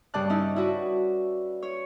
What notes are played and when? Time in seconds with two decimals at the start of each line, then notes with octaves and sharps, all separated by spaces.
0.14 G2 C#3 D5 G5 A5 F#6
0.30 C#4 D#4 E4 D5
0.56 E4 F#4 B4
1.63 C#5